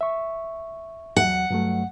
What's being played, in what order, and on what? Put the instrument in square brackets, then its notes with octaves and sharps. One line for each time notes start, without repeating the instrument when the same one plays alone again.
[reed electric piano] E5 C#6
[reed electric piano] E2 F#3 [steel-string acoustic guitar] F#5
[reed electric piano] G2 F#3 A3